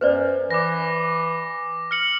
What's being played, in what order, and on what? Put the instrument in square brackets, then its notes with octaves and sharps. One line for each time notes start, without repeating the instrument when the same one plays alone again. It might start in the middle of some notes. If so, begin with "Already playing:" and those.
[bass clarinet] F#2 [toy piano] B4 C5 D5
[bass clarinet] E3 [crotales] D6 A#6
[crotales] F6 C#7 F#7